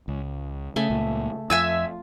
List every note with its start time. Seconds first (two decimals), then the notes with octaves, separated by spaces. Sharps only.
0.08 C#2
0.76 C#3 A3 E5 G#5
0.90 C#2 A#2
1.50 F2 F4 E5 G#5 E6